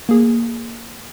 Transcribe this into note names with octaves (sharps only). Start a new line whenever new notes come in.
A#3 G#4